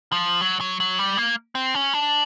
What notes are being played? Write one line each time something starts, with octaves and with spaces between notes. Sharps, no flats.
F3
F#3
F#3
F#3
G3
A#3
C4
C#4
D4